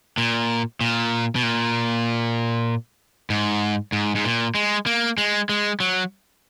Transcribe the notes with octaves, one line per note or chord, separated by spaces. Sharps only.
A#2
A#2
B2
A#2
G#2
G#2
G#2
A#2
G#3
A#3
G#3
G#3
F#3